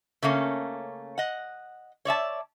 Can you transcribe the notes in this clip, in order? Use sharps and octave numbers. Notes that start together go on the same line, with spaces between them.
C#3 A3 A#3 C#4
D#5 F#5
C#5 D5 E5 A5